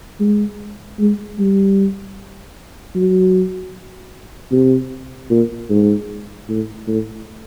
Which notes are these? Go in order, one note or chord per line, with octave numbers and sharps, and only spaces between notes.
G#3
G#3
G3
F#3
C3
A#2
G#2
A2
A2